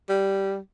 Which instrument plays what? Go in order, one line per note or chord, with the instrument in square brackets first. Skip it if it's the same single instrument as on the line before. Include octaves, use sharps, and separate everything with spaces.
[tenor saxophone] G3